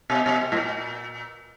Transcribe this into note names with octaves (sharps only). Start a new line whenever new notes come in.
B2
B2
C3
A2
A#2